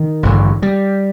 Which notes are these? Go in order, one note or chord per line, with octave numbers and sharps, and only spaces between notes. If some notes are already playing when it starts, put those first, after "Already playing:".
Already playing: D#3
A1 G2 D3
G3